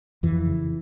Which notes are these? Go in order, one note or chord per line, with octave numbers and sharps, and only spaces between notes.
F2 E3
C#3